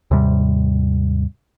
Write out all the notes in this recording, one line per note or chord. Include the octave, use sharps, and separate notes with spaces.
D#2 G#2 C3 G3